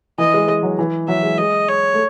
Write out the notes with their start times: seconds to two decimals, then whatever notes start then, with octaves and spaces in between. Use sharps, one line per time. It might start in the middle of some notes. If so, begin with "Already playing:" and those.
0.18 E3 D#5
0.34 G#3
0.48 G#3
0.63 F#3
0.79 E3
1.08 F#3 E5
1.23 G#3
1.38 G#3 D#5
1.68 C#5
1.94 A3